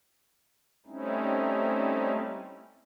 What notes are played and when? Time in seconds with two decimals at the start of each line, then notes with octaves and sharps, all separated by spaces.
0.86 G3 A3 C4 C#4 D#4 E4